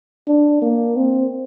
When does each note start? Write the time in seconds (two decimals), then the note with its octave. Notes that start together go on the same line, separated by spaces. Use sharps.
0.27 D4
0.62 A#3
0.96 C4